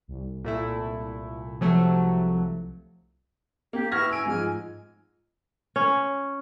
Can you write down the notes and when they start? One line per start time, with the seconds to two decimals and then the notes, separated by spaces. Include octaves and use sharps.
0.08 C2
0.44 A#2 A3 E4
1.61 C3 F3 F#3 A3
3.73 A#3 G4
3.92 E4 B4 C#6 F6 G#6 A#6
4.09 G#5 E6 D7
4.26 G#2 F3 G#3 G#5 F6
5.76 C#4